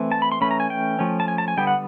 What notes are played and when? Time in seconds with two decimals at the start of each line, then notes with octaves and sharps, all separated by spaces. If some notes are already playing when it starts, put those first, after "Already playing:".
Already playing: E3 A3 C4
0.12 A5
0.22 B5
0.32 C6
0.41 E3 A3 C#4 B5
0.51 A#5
0.60 G#5
0.70 G5
0.99 F3 A3 C#4
1.20 A5
1.28 G#5
1.38 A5
1.48 G#5
1.57 D3 G3 B3 G5
1.67 F#5